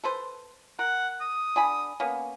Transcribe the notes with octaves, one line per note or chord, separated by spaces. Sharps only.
A4 B4 C5
A#4 F#5
D#6
D3 G#5 B5
A#3 B3 C#4